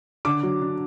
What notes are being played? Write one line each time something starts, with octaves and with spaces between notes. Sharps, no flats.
D3 D6
F#3
D4